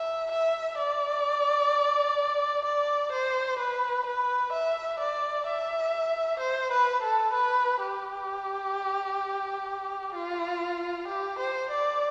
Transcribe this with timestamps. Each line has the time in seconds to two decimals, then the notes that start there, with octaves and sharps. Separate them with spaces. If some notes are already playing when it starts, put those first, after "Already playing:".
Already playing: E5
0.31 E5
0.78 D5
2.65 D5
3.12 C5
3.59 B4
4.06 B4
4.53 E5
4.99 D5
5.46 E5
6.40 C5
6.72 B4
7.03 A4
7.33 B4
7.80 G4
10.14 F4
11.08 G4
11.39 C5
11.70 D5